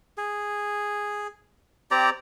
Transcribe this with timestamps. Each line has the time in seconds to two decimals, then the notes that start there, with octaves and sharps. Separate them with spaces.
0.18 G#4
1.91 C4 G4 D5 A#5